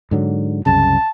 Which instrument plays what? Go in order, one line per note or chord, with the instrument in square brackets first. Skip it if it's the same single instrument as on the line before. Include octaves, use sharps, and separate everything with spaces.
[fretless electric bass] G#2 D3 F#3
[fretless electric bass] C2 F#2 C#3 [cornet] A5